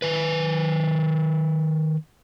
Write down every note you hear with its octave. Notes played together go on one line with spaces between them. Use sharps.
D#3 B4